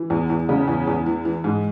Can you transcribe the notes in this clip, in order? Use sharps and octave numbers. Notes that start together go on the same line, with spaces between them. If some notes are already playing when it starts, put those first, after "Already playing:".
Already playing: E3
E2
E2
C#3
E2
E2
E3
E3
G#2